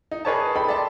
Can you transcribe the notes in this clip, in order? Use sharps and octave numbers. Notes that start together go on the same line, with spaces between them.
D#4
G#4 A#4 B4 C#5 D5 A5
D#4 A4 G5 B5
D5 E5 A5 C6